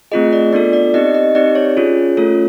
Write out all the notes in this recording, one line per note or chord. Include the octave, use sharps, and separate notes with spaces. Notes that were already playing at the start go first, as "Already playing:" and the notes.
A3 C4 F4 G#4 D#5
D5
B3 D4 F4 A4 D5
D5
C4 D#4 G4 D#5
D#5
C4 D#4 G4 D5
C#5
C#4 F4 G#4
A3 C#4 F4 A4